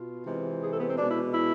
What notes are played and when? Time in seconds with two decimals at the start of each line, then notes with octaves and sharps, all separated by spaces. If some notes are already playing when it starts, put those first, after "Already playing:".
Already playing: B2 F4
0.25 C3 E3 G#3
0.62 G#4
0.71 A4
0.78 B3
0.88 C4
0.97 B2 G#3 D4
1.08 E4
1.32 E4